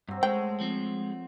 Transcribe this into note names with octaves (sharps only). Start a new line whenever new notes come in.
G2 F#3 C4
G#3 A3 G5
F3 C4